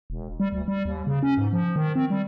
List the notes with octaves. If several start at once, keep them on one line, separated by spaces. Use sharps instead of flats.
E1
G3
D2
G3
D#2
C#3
C#4
G#2
F3
D#3
C4
G3